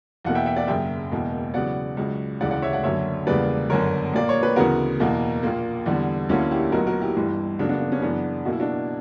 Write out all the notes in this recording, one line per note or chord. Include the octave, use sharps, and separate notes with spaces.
E2 B2 A#3 F#5
E5 G5
E5 G5
D5 F#5
F#1 F#2 C#3 E5 G5
E1 E2 B2 A#3
E2 C#3 F#3 B3 D5 F#5
C#2 C#3 F#3
E1 D2 C#3 E3 D5 F#5
D5 F#5
C#5 E5
D5 F#5
F#1 F#2 D3 F#3 C#5 E5
E1 E2 C#3 G3 A#3 B4 D5
G1 F#2 D3 A#4 C#5
A#1 A#2 A#3 D5
C#5
B4
D2 C#3 E3 B3 F#4 A#4
E2 B2 A#3
A#1 A#2 A#3
E2 D3 G3 B3
D2 D3 F#3 A#3 C#4 E4
E4 G4
B1 A#2 F#3 B3 F#4 A#4
F#4 A#4
E4 G4
G1 G2 E3
F#2 C#3 F#3 A#3 D4 F#4
B3 D4
B3
C#4
F#2 C#3 E3 B3 D4
B1 B2 A#3 F#4
E4
D4 F#4